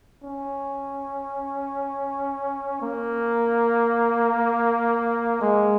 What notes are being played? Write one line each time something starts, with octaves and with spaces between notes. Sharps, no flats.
C#4
A#3
G#3